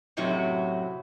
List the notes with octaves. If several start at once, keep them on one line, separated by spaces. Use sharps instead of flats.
F#2 A2 C3 F#3 F#4